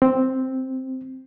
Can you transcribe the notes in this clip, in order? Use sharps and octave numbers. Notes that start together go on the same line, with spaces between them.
C4